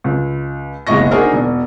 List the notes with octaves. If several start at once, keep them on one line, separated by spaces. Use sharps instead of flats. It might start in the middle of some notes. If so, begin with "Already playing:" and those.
C#2
F#1 B1 G#3 D#5 C#6 A#6
D4 D#4 F#4 G#4 A#4 C5
E1